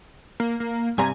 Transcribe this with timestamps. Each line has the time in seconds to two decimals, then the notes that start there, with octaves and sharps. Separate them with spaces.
0.40 A#3
0.60 A#3
0.98 G2 C3 G#5 A#5